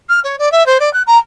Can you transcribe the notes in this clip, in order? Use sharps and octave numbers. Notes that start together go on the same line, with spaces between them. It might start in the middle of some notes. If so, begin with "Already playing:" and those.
F6
C#5
D5
E5
C5
D5
F#6
A#5